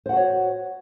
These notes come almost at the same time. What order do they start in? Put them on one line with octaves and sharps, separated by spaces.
C5 F#5 F#4 C#5